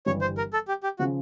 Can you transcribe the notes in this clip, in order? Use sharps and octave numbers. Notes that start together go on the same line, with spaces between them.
G1 G2 E3 G3 C#5
C5
A#4
A4
G4
G4
C#3 F3 F#4